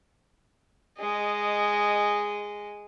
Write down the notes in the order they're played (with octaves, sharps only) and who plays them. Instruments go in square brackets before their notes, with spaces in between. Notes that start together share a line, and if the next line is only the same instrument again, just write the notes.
[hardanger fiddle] G#3 D#5